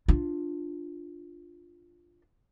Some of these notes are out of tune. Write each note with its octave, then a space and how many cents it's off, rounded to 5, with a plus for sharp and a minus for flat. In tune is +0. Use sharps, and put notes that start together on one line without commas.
D4 +5 F4 +0